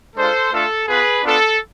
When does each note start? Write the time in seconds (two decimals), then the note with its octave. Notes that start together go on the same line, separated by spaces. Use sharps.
0.16 G#3 D4 F4 A4 C5
0.52 A3 D4 F4 A4
0.88 B3 F4 G#4 B4
1.24 B3 D4 F4 A4